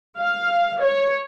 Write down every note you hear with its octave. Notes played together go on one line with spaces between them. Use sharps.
F5
C#5